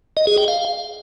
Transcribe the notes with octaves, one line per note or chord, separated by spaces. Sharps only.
D#5
G#4
G5
F5